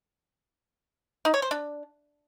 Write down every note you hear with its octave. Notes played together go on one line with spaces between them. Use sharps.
D#4
C#5
C5
D4